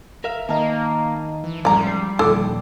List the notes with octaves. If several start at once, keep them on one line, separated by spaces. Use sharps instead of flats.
A#4 E5 F5
D#3 A#3 D#5 F5 A5 A#5
E3
A1 F3 G3 G#3 D5 A#5
C7
D#1 D3 F3 A4 D6